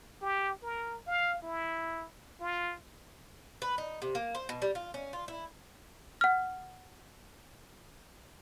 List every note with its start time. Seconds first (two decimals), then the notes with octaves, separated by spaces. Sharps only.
0.21 G4
0.62 A#4
1.07 F5
1.42 E4
2.40 F4
3.62 B4
3.78 D#4
4.02 C3
4.15 A#3
4.35 C5
4.49 B2
4.62 G3
4.75 F4
4.94 C#4
5.13 F4
5.28 E4
6.21 F#5 F6